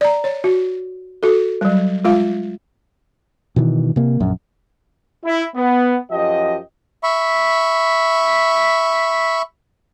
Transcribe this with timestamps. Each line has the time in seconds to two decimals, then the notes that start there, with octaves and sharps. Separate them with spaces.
0.01 D5 A#5
0.24 C#5
0.44 F#4
1.23 F#4 A4
1.61 F#3 G3
2.04 G#3 F4 F5
3.56 B2 D#3 E3
3.96 C3 A#3
4.20 A#1 F#2
5.24 E4
5.54 B3
6.11 F#2 F3 G4 D#5
7.03 E5 B5 C#6